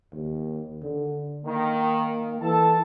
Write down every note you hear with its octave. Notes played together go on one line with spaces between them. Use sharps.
D#2
D3
D#3 A#3
E3 A4 A5